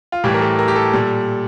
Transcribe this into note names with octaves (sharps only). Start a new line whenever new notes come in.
F4
A2 E3 G3 G4
A#4
A4
A#4
G4
A4
A#2 G3